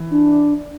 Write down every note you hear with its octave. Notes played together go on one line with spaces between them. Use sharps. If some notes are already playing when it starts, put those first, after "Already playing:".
Already playing: E3
D4